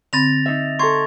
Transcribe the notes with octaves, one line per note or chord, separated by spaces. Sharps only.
D3 C4 B5 A6 A#6 F7
D#4 E5
A4 A#5 C6 C#6 G#6